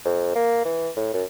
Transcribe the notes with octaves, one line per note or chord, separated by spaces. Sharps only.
F2
A#3
E3
A2
F#2